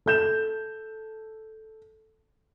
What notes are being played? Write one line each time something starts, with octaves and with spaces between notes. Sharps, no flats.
A4 G6 E7